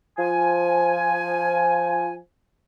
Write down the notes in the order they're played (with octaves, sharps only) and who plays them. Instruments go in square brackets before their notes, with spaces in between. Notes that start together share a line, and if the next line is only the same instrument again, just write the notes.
[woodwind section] F3 G#5